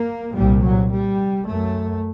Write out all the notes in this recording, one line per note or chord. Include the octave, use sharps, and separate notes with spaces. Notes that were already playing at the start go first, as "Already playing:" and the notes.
Already playing: A#3
C2 A#2 G3
F#3
G3
F#2 A3